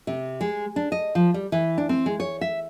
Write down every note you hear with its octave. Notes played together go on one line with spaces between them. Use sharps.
C3
G#3
D4
D#5
F3
G3
E3
D4
C4
G#3
C#5
E5